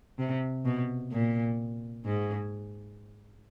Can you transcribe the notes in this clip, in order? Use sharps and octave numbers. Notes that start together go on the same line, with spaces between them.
C3
B2
A#2
G#2